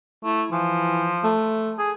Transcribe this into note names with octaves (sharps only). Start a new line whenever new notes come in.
A3 E4
E3 F3
A3
G#4